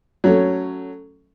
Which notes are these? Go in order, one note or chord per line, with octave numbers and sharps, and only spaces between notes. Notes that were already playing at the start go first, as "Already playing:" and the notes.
F#3 A3 C#4